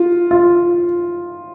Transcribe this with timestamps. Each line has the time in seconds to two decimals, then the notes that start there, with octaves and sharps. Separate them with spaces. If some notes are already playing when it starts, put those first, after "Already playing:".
Already playing: F4
0.31 F4